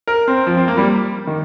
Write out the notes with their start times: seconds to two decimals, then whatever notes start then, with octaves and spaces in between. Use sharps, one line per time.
0.07 A#4
0.28 C4
0.47 F3
0.57 C4
0.68 A#3
0.78 G3
1.27 D#3